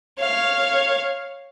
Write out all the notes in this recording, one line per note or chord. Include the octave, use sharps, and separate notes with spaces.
C#5 F5